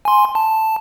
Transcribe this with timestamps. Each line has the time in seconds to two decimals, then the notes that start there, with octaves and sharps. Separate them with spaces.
0.05 G#5 C6
0.35 A5